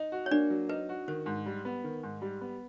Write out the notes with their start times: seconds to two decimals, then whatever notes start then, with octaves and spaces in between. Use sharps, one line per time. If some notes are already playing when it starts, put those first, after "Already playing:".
Already playing: D#4
0.12 F#4
0.26 C#5
0.31 A#3 D4 D5
0.50 F#3
0.69 D#4 B4
0.89 F#4
1.08 D#3 C5
1.26 G#2
1.46 G3
1.65 B3
1.84 D#3
2.03 G#2
2.22 G3
2.41 B3